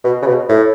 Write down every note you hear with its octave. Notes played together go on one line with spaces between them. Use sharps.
B2
C#3
B2
A2